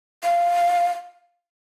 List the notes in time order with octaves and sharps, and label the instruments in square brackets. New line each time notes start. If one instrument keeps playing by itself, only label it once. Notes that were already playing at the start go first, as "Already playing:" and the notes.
[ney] F5